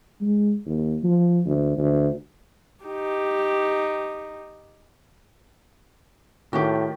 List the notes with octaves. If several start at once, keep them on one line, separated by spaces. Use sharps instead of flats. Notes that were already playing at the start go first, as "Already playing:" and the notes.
G#3
D#2
F3
D2
D2
D#4 G4
A2 D#3 F#4 G4